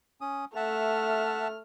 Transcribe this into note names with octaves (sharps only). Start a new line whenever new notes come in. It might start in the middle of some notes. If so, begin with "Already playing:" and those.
C#4 D#6
A3 E5 F#5 A5 F6